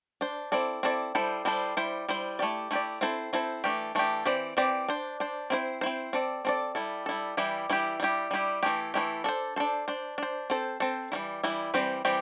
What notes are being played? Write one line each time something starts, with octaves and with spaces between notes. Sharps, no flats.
D4 C5
C4 E4 A4 D5
C4 E4 A4 D5
G3 E4 A4 C5
G3 E4 A4 C5
G3 E4 C5
G3 E4 C5
A3 E4 G4 D5
A3 E4 G4 D5
C4 E4 A4 C5
C4 E4 A4 C5
E3 A3 D4 G4
E3 A3 D4 G4
E3 C4 G4 D5
E3 C4 G4 D5
D4 C5
D4 C5
C4 E4 C5
C4 E4 C5
C4 A4 D5
C4 A4 D5
G3 E4 A4
G3 E4 A4
E3 G3 E4 G4
E3 G3 E4 G4
G3 E4 G4
G3 E4 G4
E3 A3 E4 G4
E3 A3 E4 G4
D4 A4 C5
D4 A4 C5
D4 C5
D4 C5
C4 A4 C5
C4 A4 C5
E3 G3 E4
E3 G3 E4
E3 G3 C4 G4 C5
E3 G3 C4 G4